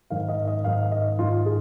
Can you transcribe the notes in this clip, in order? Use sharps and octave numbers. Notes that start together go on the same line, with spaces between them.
G#2 D#3 F5
D#5
D#5
G#2 D#3 F5
D#5
G#2 D#3 F4
G#4